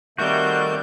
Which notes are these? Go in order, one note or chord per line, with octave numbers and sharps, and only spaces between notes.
D#3 G3 A3 C4 F#4 G6